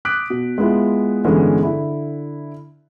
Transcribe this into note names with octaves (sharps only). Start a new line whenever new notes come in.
D6 D#6 F#6 B6 D7
B2
G#3 B3 E4 F4
G2 D3 E3 G#3 B3 C#4
D3 E4